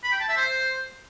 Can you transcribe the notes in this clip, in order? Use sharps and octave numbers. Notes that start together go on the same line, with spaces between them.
B5
G5
A5
E5
C5